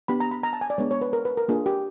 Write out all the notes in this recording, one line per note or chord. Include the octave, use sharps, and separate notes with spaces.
B3 D4 G4 B5
A#5
B5
A#5
A5
G#5
D5
G#3 B3 D4 C#5
C#5
B4
A#4
B4
A#4
A#3 D4 F4 G#4
G4